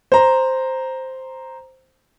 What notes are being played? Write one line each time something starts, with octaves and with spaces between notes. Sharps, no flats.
C5 A#5